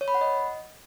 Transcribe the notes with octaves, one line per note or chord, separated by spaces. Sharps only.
C#5
B5
F#5
D#5